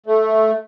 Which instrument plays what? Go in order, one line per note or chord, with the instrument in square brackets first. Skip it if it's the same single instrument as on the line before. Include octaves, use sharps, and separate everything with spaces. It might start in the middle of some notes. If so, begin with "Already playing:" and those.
[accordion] A3